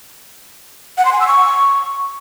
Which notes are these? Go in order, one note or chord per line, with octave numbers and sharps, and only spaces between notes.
F#5
C6
G#5
E6
C#6